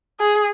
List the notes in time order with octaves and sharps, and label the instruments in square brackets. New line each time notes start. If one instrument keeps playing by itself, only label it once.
[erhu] G#4